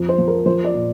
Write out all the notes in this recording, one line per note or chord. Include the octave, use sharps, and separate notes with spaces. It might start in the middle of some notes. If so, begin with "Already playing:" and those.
Already playing: F2
C5
F3
A#4
F3 C5
D5
A#2